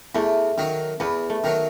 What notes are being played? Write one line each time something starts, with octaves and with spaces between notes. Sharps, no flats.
E2 A3
D#3 F#3
E2 B3
A3
D#3 F#3